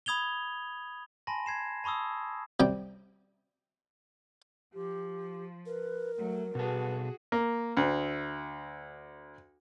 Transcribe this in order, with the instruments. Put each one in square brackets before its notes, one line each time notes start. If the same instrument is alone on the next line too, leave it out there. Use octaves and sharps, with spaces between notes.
[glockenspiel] B5 D#6 G#6 F7 G7
G#5 A5 B5 C6 A#6
G#6 C7 E7
A5 B5 C#6 D#6 E6
[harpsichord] C3 G3 G5
[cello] F3 [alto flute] G4
[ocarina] A#4 [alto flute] B4
[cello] F#3 [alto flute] A3
[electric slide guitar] B2 A4 [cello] F#4 G#4 [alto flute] B4
[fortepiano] A#3
D2